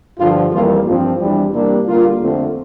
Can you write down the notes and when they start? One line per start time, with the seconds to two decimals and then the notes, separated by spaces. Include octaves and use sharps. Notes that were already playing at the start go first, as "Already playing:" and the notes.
0.19 G2 D3 F3 F4
0.53 F2 E3 G3 A#3 F4
0.86 G2 F3 C4 F4
1.19 E2 E3 G3 D4
1.53 C3 G3 A#3 D4
1.86 D3 G3 A#3 F4
2.19 F2 D3 A3 C4